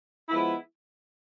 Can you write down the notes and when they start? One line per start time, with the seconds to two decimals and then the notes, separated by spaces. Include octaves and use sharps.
0.29 F3 G#3 B3 E4